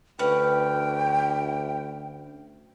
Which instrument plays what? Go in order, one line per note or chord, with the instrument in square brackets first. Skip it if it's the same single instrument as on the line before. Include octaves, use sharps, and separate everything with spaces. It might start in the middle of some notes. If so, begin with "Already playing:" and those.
[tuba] D2 [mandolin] C#4 B4 [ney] G5